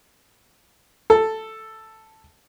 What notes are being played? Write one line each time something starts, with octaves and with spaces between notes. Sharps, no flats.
A4